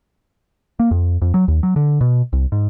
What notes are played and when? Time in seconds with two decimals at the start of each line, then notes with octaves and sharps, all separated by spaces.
0.80 A#3
0.91 F2
1.22 F2
1.34 F#3
1.48 D#2
1.63 F#3
1.76 D3
2.01 B2
2.33 C2
2.52 G#2